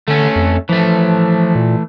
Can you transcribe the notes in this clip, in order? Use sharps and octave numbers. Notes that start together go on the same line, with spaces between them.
D3 A3 C#4
F2
E3 F3 A3
A#2